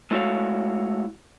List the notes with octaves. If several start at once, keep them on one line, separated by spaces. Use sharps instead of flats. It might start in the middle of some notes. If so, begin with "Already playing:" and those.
G#3 A3 E4 F#4 C#5 F5